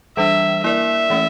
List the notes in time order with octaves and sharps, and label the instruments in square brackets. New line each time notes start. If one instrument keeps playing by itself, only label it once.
[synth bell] E3 G3 D4 [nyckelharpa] E5
[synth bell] A#3 E4 A#4 D5 [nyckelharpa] E5
[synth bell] E3 A3 C#4